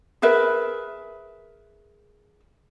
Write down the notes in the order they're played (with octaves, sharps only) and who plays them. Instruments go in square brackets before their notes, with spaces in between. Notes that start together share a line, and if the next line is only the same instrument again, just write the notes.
[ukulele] G#4 A#4 B4 E5